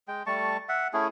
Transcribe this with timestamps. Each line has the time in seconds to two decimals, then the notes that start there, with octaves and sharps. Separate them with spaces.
0.08 G#3 G5
0.27 G3 A3 A5 C#6
0.69 E5 F#5
0.93 A3 C#4 E4 G#4